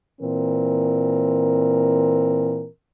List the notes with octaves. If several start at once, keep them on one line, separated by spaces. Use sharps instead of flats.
A#2 E3 C4 A#4